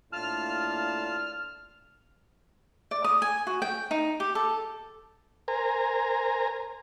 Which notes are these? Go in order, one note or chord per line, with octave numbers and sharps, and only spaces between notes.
A2 A#3 D4 F4 A5 F6
D5
D#6
G#5
F#4
G5
D#4
G4
A4
A#4 C5 G#5 A#5